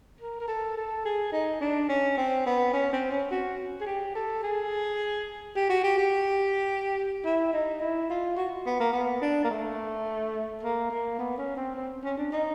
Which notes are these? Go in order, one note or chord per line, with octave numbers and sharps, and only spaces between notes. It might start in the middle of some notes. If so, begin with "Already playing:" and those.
A#4
A#4
A4
A4
G#4
D#4
D4
C#4
C4
B3
C#4
C4
C#4
F#4
G#4
G4
A4
G#4
G4
F#4
G4
G4
E4
D#4
E4
F4
F#4
B3
A#3
B3
D4
A#3
A3
A#3
A#3
B3
C#4
C4
C4
C#4
D4
D#4